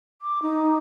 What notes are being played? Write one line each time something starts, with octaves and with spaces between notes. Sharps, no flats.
D6
D#4